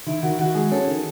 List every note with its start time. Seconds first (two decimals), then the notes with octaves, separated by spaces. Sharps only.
0.07 D#3 E4
0.23 D#3 F#4
0.39 D#3 F#4
0.55 G#3 G#4
0.71 C#4 A4
0.87 D#3